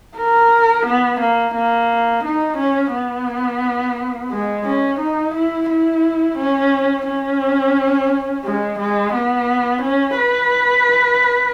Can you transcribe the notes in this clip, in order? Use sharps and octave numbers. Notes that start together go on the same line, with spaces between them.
A#4
B3
A#3
A#3
D#4
C#4
B3
G#3
C#4
D#4
E4
E4
C#4
C#4
G#3
G#3
B3
C#4
B4